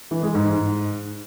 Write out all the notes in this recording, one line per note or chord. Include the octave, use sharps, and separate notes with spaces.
E3
G#3
G#2